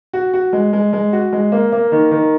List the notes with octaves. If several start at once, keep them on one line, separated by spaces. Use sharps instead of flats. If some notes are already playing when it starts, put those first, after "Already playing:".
F#4
F#4
G#3
G#3
G#3
F#4
G#3
A#3
A#3
D#3
D#3